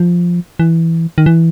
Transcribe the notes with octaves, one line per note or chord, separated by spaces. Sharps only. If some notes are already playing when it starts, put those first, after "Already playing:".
Already playing: F3
E3
D#3
E3